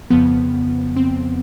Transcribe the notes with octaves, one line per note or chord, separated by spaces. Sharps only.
F2 C#3 F3 B3
C4